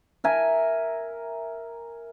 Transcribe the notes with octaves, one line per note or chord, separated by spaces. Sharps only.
A#4 E5 G#5